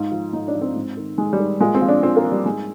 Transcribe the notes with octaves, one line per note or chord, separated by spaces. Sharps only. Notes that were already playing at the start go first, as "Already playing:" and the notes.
Already playing: G#2 F4
F3
G#2 D#4
D4
F3
C4
G#2
D#3
G#2 G#3
G3
D#3
A#2 G#3
C4
F3
D4
A#2 C4
A#3
F3
G3
G#2 G#3